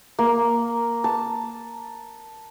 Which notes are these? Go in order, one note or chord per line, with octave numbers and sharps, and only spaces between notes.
A#3
A5